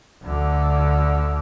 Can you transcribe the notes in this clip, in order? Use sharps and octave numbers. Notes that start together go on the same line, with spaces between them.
D2 D3